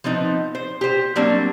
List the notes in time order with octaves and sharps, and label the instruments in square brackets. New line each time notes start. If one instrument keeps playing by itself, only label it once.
[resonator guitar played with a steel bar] F3 B3 C4 D#4
C5
G4 C5
F#3 G3 A#3 C4 D4